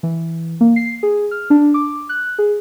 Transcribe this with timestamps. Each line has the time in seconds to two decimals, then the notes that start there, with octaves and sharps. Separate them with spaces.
0.03 E3
0.61 A#3
0.76 C7
1.03 G#4
1.31 F6
1.50 D4
1.74 D6
2.09 F#6
2.38 G#4